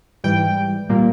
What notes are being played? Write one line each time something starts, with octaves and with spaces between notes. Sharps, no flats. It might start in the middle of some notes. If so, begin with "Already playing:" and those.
G#2 E3 G3 G5
A#2 G3 A#3